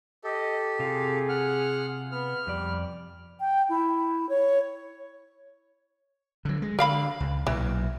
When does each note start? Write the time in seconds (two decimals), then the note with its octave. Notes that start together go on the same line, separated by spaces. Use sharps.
0.24 G4 A4 D#5
0.79 C3 F4 G#4
1.29 F#5 F6
2.12 B3 F6
2.47 F2 G3 D5
3.40 G5
3.69 E4
4.29 C#5
6.45 D3 F#3
6.62 G#3
6.79 D3 A#4 F5 B5
7.20 C#2
7.47 B1 A#2 E3 F#3